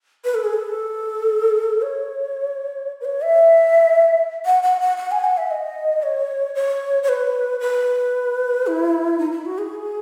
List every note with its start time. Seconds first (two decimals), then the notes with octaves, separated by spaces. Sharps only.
0.25 B4
0.34 A4
0.44 G#4
0.53 A4
1.82 C#5
3.01 B4
3.05 C#5
3.23 E5
4.46 F#5
4.63 F#5
4.81 F#5
4.97 F#5
5.11 G#5
5.24 F#5
5.37 E5
5.51 D#5
6.03 C#5
6.55 C#5
7.03 C#5
7.09 B4
7.60 B4
8.67 E4
9.19 D#4
9.31 E4
9.46 F#4
9.58 G#4